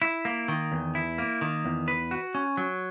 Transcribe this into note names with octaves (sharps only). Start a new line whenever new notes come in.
E4
A#3
D#3
E2
E4
A#3
D#3
E2
B4
F#4
C#4
F#3